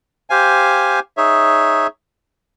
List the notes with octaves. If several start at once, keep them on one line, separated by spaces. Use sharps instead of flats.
G4 C5 F5 G#5
D#4 G#4 C#5 E5